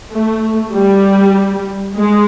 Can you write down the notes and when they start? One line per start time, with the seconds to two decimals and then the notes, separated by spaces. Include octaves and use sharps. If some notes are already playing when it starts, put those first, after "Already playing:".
0.13 A3
0.73 G3
1.96 G#3